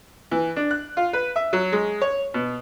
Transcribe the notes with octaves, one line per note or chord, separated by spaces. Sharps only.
E3
D4
F#6
F4
B4
E5
F#3
G#3
C#5
B2